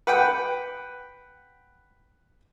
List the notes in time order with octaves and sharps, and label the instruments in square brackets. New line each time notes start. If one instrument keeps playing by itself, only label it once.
[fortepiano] B4 F#5 G5